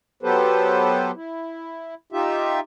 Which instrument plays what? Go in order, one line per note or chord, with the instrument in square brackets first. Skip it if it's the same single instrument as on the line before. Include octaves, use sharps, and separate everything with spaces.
[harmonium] F#3 B3 G4 A4 B4 C5
E4
D#4 F4 G4 E5